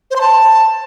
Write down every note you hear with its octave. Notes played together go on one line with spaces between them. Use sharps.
C5
C6
A5